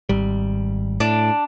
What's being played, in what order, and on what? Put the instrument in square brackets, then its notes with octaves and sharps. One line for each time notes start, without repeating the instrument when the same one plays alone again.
[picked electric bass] G#1 G3
[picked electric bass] A2 [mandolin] D4